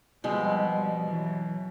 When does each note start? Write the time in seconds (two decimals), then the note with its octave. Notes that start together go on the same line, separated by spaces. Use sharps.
0.24 B2 F3 G3 G#3 C4
0.66 F3 G3
1.08 E3 F#3